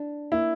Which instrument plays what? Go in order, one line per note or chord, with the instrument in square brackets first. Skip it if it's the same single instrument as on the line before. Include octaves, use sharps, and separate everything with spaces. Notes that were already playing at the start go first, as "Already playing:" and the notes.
Already playing: [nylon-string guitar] D4
[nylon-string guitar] A#3 [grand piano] E4